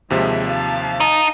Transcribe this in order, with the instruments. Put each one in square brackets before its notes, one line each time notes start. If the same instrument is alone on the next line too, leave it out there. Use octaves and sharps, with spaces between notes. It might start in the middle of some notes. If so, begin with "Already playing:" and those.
[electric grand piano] D#2 C3 F3 [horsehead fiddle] G#3 E5
[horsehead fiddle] F5 A5
[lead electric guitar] D#4